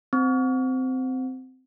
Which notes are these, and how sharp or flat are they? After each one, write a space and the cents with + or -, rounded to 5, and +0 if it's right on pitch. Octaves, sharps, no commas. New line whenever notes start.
C4 -15